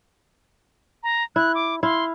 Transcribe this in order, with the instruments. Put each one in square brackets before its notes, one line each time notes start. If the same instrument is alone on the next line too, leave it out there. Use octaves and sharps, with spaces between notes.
[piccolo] A#5
[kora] E4 [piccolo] F#6
[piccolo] D6
[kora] E4 F5 [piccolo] C6